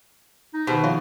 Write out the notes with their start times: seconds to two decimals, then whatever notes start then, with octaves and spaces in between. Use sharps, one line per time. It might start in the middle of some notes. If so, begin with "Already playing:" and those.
0.54 D#4
0.67 B2 D#3 F#4 G#4 C5
0.84 F3 F4 C#5